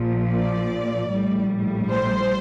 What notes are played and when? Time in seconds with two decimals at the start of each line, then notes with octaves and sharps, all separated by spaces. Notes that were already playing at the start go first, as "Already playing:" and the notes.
Already playing: A#1 A#2 F3
0.32 D5
1.11 A#1 A2 G3
1.90 C5